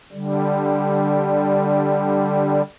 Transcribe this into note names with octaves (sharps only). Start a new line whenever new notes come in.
D3 G3